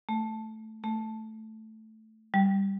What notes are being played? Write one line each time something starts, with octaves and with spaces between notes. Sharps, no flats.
A3
A3
G3